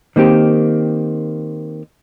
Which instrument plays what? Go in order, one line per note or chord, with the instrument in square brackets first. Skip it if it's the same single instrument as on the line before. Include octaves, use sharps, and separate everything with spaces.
[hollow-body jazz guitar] D#3 A#3 C4 G4